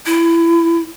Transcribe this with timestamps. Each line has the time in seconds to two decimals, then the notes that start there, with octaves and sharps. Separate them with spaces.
0.06 E4